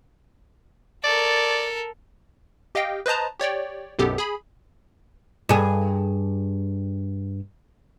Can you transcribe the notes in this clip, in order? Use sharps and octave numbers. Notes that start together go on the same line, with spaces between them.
A4 A#4 D5
G4 D#5 F5 G5
B4 C5 D#5 A5 A#5
G4 C#5 D5 G5
B1 F#2 B2 B3 G4 A4
G#4 G#5 B5
G2 G#4